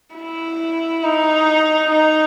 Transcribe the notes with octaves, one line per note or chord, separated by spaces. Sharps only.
E4
D#4
D#4